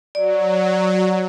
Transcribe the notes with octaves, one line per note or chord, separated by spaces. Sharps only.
F#3 D5